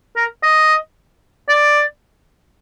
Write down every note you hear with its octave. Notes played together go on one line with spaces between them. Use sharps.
A#4
D#5
D5